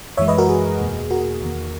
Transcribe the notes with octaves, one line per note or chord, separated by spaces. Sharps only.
F#2 E3 G#3 C#5 E5
B4 D#5
F#4 A#4
G#4
E2 B2 A#3
F#4 A#4
E2 D#3 A#3